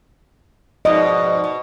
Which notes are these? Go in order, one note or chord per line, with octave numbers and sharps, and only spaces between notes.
F2 G#2 B2 D5 D#5
B2